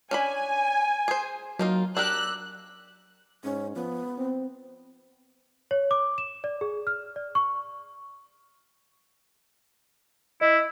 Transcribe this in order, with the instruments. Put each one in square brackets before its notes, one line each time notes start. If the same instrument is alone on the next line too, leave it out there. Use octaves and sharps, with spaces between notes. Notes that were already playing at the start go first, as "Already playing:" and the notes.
[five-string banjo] C#4 D4 B5 [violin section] G#5
[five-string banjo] G#4 C5
[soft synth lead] F#3 [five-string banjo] A#3 D#4 F4
[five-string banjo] D4 G4 A#4 [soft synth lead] E6 [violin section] F#6
[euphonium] G#2 [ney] C#4
[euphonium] F3 [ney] B3
[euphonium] C4
[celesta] C#5
D6
E7
D5
G#4
F6
D5
C#6
[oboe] E4 [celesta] D#5